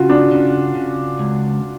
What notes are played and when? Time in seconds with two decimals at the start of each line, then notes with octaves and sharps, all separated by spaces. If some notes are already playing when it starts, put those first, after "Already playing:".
Already playing: C#3 F4 F#4
0.09 D4
0.31 C#3
0.75 C#3
1.19 C#2